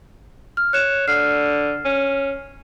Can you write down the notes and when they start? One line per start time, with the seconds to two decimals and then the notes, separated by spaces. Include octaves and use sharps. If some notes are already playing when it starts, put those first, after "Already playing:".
0.57 F6
0.73 C#5 F#6 E7
1.08 D3 F6 C7
1.85 C#4